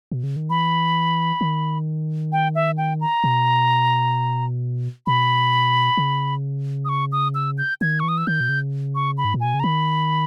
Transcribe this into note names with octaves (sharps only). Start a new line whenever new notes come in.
B2
C#3
D#3
E3 B5
D#3
G5
E5
G5
A#5
B2
B2 B5
C#3
D#6
C#6
D#6
E6
G6
D#3 G#6
E3 C#6
D#6
E6
D#3 G6
B2
C#3
C#6
B5
G#2
A#2
B2 G#5
C#3
A#5
D#3 B5